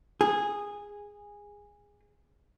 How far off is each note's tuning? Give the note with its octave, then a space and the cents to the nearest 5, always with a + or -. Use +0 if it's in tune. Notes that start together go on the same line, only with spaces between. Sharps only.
G#4 -15